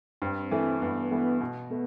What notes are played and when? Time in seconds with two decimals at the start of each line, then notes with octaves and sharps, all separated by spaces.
0.22 G2 C4
0.51 E3 A3
0.81 G2 B3
1.11 E3 A3 B3
1.40 B2
1.70 A3 B3